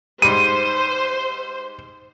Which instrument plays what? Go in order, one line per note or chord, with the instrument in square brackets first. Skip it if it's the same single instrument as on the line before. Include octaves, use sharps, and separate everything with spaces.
[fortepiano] G#2 G3 [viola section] C5 [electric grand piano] D#7